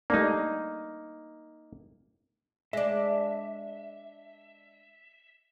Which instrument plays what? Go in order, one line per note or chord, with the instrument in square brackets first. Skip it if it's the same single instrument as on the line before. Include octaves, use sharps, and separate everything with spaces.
[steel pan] G3 A3 D4 [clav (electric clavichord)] A#3 D#4
[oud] G#3 D4 [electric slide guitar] E5